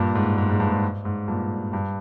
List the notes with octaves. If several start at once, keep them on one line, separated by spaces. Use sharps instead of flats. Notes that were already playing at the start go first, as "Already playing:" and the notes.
Already playing: G2 A#2
G#2
G#2
G#2
G2
G#2
G#2
G2 A#2
G2